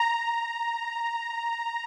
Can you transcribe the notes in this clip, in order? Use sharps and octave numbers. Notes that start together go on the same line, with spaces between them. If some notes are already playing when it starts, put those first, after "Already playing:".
Already playing: A#5